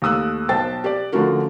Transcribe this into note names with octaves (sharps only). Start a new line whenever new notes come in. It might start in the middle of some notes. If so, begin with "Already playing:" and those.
D#2 A3 D#6 E6 F#6
B1 C5 G5 A5 A6
G4 D5
D3 F3 A3 C#4 F#4 A#4